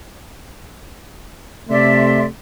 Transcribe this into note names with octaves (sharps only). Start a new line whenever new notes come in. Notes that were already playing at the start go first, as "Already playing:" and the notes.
C3 A3 D5 E5 C6